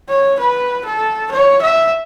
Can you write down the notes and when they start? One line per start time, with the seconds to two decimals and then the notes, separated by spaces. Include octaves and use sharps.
0.09 C#5
0.40 B4
0.86 A4
1.32 C#5
1.62 E5